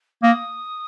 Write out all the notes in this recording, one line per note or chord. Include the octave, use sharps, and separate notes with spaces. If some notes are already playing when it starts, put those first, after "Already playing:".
A#3 D#6